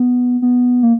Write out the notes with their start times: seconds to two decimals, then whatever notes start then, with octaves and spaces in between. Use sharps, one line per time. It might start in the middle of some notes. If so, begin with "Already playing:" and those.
Already playing: B3
0.42 B3
0.83 A#3